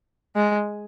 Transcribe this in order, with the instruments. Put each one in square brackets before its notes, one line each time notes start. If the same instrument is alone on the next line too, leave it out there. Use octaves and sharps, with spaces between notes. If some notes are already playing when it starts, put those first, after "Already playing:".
[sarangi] G#3